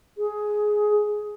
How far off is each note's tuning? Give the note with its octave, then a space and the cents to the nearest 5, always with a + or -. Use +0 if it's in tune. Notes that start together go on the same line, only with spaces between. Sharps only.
G#4 +10